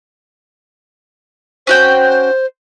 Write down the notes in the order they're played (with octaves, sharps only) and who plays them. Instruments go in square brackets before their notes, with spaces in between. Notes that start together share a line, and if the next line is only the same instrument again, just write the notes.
[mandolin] C#4 F#4 G5 [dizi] C5